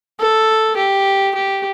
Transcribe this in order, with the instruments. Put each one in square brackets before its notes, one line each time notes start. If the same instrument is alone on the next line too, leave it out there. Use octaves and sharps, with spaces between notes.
[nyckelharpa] A4
G4
G4